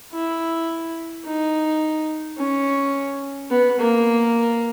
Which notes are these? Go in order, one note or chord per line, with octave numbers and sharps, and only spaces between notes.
E4
D#4
C#4
B3
A#3